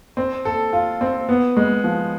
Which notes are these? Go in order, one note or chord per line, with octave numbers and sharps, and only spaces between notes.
C4
A4
F4
C4
B3
G#3
F3